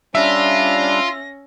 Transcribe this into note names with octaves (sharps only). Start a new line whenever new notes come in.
G3 C#4 D4 F4 E5 A#6